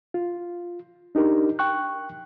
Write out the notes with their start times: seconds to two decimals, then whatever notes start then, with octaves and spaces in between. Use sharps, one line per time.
0.14 F4
1.15 D4 D#4 G4 A#4
1.59 G5 C#6 F#6